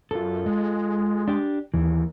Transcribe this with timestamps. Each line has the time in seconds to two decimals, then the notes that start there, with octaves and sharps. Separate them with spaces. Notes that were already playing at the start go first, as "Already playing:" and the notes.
0.11 F#2 F4 A4
0.46 G#3
1.28 D4 G4
1.74 D#2 E3